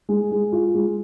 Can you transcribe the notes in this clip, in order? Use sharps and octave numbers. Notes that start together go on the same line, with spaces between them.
G#3
G#3
F4
G#3